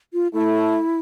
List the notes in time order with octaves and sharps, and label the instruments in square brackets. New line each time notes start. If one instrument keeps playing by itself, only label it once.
[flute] F4
[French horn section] A3 [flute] E4